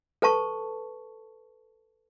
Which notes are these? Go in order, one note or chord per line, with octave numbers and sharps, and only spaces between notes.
A4 B4 A5 C#6